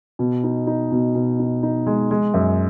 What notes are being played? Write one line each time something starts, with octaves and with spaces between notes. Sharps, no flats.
B2
D#4
D#4
B2
B2
D#4
D#4
G#3
G#3
F#2